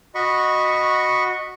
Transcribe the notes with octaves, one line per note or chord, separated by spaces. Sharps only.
F#4 D#5 B5 C#6